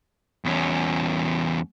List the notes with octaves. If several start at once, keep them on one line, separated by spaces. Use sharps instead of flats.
E2 C#4